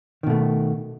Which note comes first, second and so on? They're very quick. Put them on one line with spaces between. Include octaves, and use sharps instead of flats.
D#3 B2 A3